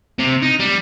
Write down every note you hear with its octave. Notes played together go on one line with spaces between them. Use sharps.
C3
D#4
G3